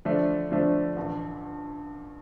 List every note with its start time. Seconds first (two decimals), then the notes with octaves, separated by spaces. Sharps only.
0.05 D3 F3 A3 D4
0.51 D3 F3 A3 D4
0.96 A1 G2 D3